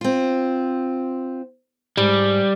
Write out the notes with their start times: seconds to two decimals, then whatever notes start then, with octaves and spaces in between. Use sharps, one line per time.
0.01 C4 F4
1.97 G#2 G3